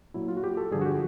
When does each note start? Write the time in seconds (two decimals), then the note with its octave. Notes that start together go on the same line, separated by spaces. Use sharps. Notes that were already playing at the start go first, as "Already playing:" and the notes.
0.14 A#2 F#3 E4
0.28 F4
0.37 F#4
0.44 G4
0.57 A4
0.71 G2 D3 F3 G#4
0.81 F#4
0.86 G4